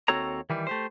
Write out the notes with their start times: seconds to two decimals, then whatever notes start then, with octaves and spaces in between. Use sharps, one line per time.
0.08 D#2 C4 F#4 A4 C#5 A#5
0.50 D#3 E3 G3
0.67 A3 G4 C5